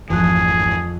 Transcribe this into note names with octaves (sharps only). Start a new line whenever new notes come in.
G#1 F2 E3 G#4 F#6